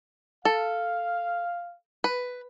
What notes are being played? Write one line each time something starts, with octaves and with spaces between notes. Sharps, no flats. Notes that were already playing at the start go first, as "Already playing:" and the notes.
A4 F5
B4